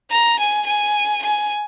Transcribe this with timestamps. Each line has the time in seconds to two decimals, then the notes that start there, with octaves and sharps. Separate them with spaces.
0.10 A#5
0.39 G#5
0.66 G#5
1.23 G#5